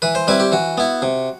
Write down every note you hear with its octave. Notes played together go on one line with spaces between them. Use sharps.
E3 B4
C5
G3 C4 E4 B4
G4
E3 F#4
B3 E4
C3